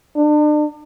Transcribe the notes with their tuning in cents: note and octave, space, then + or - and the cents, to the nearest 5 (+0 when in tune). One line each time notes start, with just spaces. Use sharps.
D4 +35